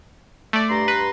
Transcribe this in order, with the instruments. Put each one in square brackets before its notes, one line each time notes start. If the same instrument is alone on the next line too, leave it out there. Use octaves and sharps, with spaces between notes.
[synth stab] A3 D5
[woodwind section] G2 A#5 C6
[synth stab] B4